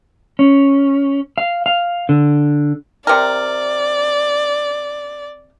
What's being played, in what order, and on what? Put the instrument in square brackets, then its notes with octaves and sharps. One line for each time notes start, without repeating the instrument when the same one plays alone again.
[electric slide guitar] C#4
F5
F5
D3
[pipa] C3 A#4 [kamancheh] D5